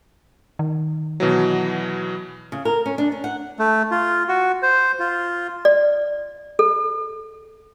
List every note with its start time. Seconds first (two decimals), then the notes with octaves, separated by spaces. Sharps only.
0.59 D#3
1.20 B2 E3 F#3
2.52 C#3
2.65 A#4
2.86 C#4
2.98 D4
3.12 C#4
3.24 F#5
3.59 A3
3.91 F4
4.28 F#4
4.62 C5
4.99 F4
5.65 D5
6.59 A4